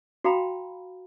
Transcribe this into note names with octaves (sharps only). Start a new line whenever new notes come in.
F#4 F5 G5 A#5 B5